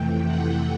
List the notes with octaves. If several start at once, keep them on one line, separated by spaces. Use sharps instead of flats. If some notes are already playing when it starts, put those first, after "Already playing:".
Already playing: F2 C3 E3 A3 G5
F#5